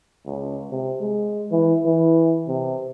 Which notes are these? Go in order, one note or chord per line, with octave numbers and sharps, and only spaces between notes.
C#2
C3
G#3
E3
E3
C3